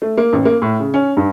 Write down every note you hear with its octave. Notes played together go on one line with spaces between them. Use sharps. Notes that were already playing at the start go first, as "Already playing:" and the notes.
A3
A#3
A1
A#3
A2
C#3
C#4
G2